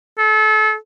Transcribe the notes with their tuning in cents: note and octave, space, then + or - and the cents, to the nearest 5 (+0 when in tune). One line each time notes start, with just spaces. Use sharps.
A4 -35